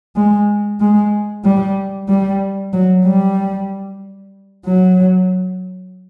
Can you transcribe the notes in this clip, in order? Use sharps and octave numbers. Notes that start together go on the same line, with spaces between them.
G#3
G#3
G3
G3
F#3
G3
F#3